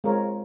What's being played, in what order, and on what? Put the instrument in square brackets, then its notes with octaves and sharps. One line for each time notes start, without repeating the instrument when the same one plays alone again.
[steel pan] G#3 C4 F4 A#4 C#5